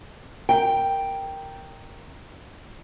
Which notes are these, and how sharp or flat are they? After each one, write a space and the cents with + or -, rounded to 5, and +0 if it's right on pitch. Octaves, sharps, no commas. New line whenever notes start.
A#4 -5 G5 +0